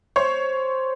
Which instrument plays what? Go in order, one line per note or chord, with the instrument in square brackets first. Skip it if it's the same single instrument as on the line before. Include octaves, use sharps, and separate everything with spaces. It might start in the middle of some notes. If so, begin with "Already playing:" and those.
[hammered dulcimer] C5 [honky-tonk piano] C#5